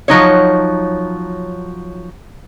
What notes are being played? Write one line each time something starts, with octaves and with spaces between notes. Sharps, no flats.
F3 F#3 D#4 C#5